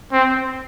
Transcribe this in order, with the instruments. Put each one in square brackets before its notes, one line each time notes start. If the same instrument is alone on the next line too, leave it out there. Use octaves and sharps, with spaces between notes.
[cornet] C4